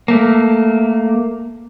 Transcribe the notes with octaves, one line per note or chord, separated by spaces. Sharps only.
A3 A#3